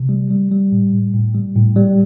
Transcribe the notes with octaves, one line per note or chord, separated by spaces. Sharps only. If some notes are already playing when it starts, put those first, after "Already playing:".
Already playing: C3
G3
G3
G3
A2
A2
A2
G3
A2
G3